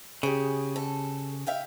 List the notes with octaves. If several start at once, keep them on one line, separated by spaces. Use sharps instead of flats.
C#3 G4 G#4
A4
E5 F5 G5